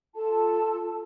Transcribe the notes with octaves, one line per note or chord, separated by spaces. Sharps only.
F4 A4 A5